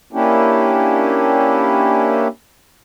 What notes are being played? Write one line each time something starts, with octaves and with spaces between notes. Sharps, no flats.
A#3 C#4 D4 E4 G4